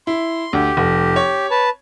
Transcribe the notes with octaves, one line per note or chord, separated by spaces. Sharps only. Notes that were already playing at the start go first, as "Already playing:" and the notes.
E4 C6
D2 G4
F1
C#5
B4 A5